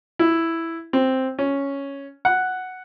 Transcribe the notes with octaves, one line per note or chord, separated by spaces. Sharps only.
E4
C4
C#4
F#5